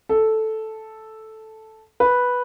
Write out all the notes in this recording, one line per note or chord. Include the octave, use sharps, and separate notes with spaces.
A4
B4